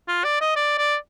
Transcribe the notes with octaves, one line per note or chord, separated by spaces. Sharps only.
F4
D5
D#5
D5
D5